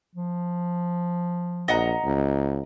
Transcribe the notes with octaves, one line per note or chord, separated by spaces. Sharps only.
F3
A#1 D#5 F#5 A#5
C#2